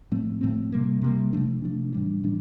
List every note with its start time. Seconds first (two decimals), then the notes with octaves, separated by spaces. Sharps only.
0.12 A2 F3 A3 C4
0.41 A2 F3 A3 C4
0.72 C3 G3 A#3
1.02 C3 G3 A#3
1.33 C3 F3 A3 D4
1.62 C3 F3 A3 D4
1.93 A2 E3 G3 D4
2.23 A2 E3 G3 D4